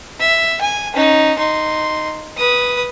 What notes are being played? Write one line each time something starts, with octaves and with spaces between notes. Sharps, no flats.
E5
G#5
C#4 D#4
D#4 C6
B4 D#6